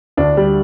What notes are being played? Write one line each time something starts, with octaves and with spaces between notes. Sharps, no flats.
D2 D4
G3